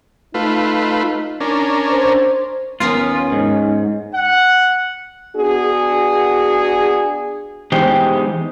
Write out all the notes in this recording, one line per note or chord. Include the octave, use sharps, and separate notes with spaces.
A3 D#4 F4 B4
C#4 D4 A#4
C5
D#2 B3 C#4 F4 A#4
G#2
F#5
B3 D4 F#4 G#4
E3 G#3 B3 D#4 G4 C5